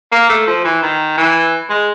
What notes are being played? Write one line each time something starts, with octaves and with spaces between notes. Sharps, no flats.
A#3
A3
F3
E3
D#3
E3
G#3